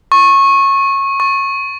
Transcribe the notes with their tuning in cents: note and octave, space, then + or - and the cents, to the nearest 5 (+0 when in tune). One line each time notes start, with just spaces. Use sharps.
C#6 -20
C#6 -20